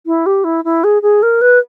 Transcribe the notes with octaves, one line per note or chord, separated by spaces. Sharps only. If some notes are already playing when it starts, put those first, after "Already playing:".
E4
G4
E4
E4
G#4
G#4
A#4
B4